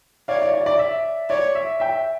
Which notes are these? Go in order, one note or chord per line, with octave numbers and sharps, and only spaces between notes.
C#5 D5 F5
D5
D5
D5
E5
C#5 D5
E5
E5 G5